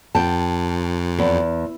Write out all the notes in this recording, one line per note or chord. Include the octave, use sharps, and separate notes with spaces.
F2 G5 A5
E2